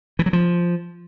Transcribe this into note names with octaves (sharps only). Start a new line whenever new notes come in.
E3
F#3
F3